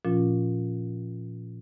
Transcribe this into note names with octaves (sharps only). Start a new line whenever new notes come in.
A#2 F3 C#4 F4